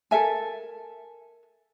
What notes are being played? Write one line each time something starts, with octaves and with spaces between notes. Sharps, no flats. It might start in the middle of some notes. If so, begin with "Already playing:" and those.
A4 A#4 E5 G#5